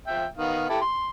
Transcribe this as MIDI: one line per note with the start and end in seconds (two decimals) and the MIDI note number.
0.07 0.25 53
0.07 0.25 76
0.07 0.25 79
0.38 0.68 51
0.38 0.68 59
0.38 0.68 77
0.69 0.80 64
0.69 0.80 67
0.69 0.80 69
0.81 1.10 84